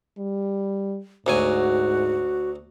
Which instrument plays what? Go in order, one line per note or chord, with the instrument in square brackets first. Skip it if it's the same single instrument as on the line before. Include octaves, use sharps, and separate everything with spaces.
[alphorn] G3
[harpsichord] D2 F#3 G#5 [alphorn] G#2 [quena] F#4